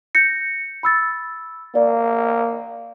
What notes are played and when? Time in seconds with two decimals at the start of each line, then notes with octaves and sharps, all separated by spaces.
0.15 G6 A#6 C#7
0.83 B5 E6 A6
1.75 A#3 D5